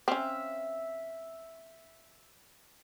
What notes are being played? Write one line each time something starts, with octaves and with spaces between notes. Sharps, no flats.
C4 C#4 E5 F5